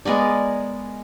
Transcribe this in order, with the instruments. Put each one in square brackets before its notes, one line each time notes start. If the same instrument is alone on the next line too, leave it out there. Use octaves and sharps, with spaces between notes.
[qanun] G#3 B3 A#4 D5